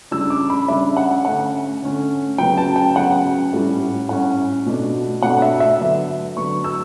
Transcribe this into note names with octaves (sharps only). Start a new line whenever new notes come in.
C#3 G3 D4 E6
D6
B5
C#3 G3 D4 E5
F#5
D3 A3 C#4 F#5
D3 A3 C#4
C#3 F#3 B3 G5
A5
G5
C#3 F#3 B3 F#5
A2 G3 C#4
A2 G3 C#4 F#5
B2 A3 D4
B2 A3 D4 F#5
E5
E5
D3 F#3 B3 D4
D3 F#3 B3 D4 C#6
E6